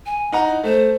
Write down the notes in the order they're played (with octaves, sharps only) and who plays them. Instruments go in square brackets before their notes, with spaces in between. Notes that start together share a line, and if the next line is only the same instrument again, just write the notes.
[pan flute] G#5
[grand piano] D#4 F#5 A#5
[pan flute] E4
[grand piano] A3 [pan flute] C5